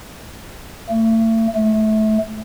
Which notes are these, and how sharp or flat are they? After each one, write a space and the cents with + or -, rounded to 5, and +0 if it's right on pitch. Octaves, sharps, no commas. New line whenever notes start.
A3 +35
A3 -25